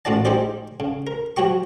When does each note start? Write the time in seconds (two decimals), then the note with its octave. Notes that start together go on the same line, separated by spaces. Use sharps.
0.05 A1 A2 F4 F#4 D5 A5
0.25 D#4 E4 G4 G#4 C5 D5
0.80 C#3
1.07 A#4
1.37 F3 F#3 F#4 G4 C#6